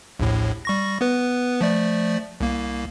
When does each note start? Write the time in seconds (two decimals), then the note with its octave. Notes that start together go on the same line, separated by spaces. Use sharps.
0.20 A#1 D#2 A2
0.65 G3 C#6 A#6
1.01 B3 B4
1.61 F3 A3 D5
2.41 C2 A#3